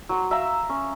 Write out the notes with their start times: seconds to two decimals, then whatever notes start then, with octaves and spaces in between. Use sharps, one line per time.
0.09 F#3 C5
0.31 E5 F5 A#5
0.69 C#4